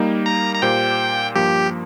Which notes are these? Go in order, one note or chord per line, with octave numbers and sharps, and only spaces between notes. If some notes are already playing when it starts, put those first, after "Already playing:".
Already playing: G3 A#3 D#4
A#5
A#5
A#2 A#3 G4 C5 G5
G2 F3 A#3 G4